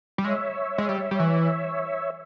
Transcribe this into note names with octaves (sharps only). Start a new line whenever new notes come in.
G3
G#3 C#5 E5
G#3
G3
G3
E3